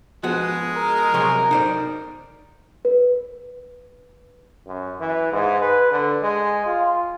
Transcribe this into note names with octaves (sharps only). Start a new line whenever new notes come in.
F3 G#3 B3 F#4
A#4
C3 F#3 C6
D#4 C5 D5
B4
F#2
E3
G#2
B4
D3
G#3
F4